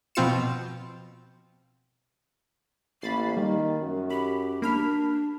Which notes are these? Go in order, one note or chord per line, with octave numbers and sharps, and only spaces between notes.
B2 F3 C4 F4 C#7 E7
A1 A#3 B5 A6 C7
D#3 G3
F#2
G4 B5
A#3 D4 B5 F6